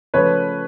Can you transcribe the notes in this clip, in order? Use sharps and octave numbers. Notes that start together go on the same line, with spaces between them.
C#3 F3 A3 B4 C#5